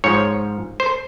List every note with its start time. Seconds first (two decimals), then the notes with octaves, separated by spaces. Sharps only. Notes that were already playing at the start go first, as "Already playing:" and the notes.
0.04 G#2 F3 C#5
0.80 C5